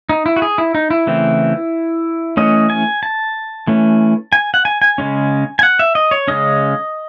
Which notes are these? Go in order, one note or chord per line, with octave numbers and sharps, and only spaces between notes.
D#4
E4
F#4
G#4
E4
D#4
E4
C#3 E3 A3 C4
E3 A3 C#4 D#5
G#5
A5
E3 A3 C#4
G#5
F#5
G#5
G#5
C#3 G#3 C#4
G#5
F#5
E5
D#5
C#5
C#3 G#3 C#4 D#5